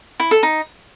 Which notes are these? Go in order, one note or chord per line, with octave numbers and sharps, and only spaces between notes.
E4
A4
D#4